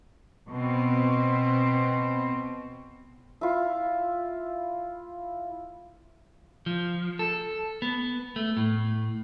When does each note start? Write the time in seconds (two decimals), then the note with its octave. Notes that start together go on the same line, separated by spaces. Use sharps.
0.49 B2 C4
3.41 E4 F4
6.66 F3
7.19 A4
7.82 B3
8.36 A3
8.57 A2